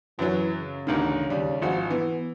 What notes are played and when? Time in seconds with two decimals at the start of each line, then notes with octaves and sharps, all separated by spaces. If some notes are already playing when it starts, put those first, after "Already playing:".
0.19 F#2 E3 F#3
0.58 C#3
0.87 A1 D2 D#3
1.30 D#2 G3
1.62 G#1 F3 F#4
1.90 E3 B3